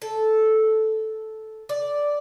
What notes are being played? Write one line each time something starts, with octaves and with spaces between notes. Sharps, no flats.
A4
D5